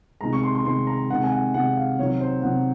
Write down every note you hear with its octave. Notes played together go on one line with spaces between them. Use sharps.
C3 D#3 G#3 A#5
C#6
C6
C6
C3 D#3 G#3 C6
A#5
C3 D#3 G#3 F#5
G#5
F#5
C3 D#3 G#3 F#5
F5
C3 D#3 F#3 C#5
C5
C3 D#3 F#3 F#5